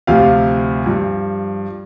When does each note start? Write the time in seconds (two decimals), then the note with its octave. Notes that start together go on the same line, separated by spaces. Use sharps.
0.07 D2 C3 F3 F5
0.86 G2 F3